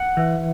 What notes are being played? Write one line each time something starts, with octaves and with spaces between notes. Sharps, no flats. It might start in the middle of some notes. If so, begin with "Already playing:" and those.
Already playing: F#5
E3